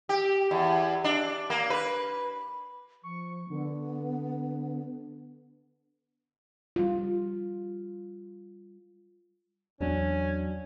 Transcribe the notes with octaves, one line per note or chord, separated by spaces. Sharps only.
G4
E2
D4
A#3
B4
F3 C#6
D3 B3
G3 F4
E2 F#3 C#4 D4